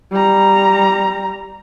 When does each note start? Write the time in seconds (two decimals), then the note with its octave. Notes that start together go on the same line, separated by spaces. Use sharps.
0.12 G3 A#5